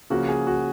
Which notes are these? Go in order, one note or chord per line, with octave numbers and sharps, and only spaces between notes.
C#3 F3 A#3 F#4
G#4
F#4